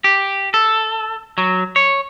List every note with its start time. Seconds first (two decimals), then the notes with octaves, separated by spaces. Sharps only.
0.04 G4
0.54 A4
1.38 F#3
1.76 C#5